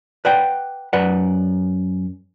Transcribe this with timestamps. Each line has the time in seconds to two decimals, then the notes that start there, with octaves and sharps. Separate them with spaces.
0.25 B4 D5 F#5 G5
0.93 F#2 B4 D5 F#5